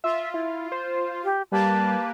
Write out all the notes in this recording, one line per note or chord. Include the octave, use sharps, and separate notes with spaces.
F4 E5
E4
C5
G4
G3 A#3 G4 B4 A5